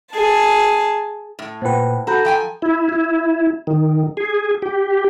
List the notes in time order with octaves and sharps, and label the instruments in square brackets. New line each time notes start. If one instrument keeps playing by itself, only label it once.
[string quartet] G#4 A5
[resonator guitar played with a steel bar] A2
[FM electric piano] A#2 B4 [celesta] C5 F#5 G5
[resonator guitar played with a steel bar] F#4 [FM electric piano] A4 [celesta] A#5 B5 G6
[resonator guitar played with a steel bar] F3 G5 G#5
[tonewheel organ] E4
E4
D#3
G#4
G4